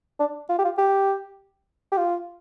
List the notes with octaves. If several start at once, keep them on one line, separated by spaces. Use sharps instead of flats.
D4
F4
G4
F4
G4
G4
F4